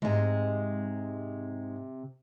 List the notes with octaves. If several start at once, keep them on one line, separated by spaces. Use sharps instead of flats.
G#2 C3 G#3